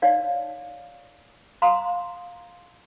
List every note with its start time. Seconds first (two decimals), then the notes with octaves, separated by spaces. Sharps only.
0.02 D#4 C#5 D5 F5
1.62 F5 A#5 C6 D#6